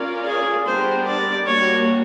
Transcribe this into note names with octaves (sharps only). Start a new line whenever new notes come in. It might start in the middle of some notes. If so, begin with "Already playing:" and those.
Already playing: C#4 F4 A#4 D5
G#4
G3 B3 D4 G4 A#4 C5
D5
G3 A#3 D4 F#4 C#5